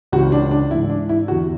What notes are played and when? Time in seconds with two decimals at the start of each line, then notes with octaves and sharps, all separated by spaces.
0.12 C#2 C#3 E3 F#4
0.32 D4
0.51 D4
0.71 E3 E4
0.75 G#2
0.90 D4
1.09 E4
1.28 E2 D3 F#4